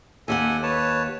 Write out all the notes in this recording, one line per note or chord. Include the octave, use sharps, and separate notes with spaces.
D#2 G4 A4 F#5 G#5
B4 C#5 A5